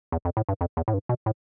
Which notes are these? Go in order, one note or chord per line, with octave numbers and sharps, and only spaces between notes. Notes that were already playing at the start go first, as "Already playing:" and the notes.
E2
F2
A2
G2
F2
E2
A2
G2
B2
A2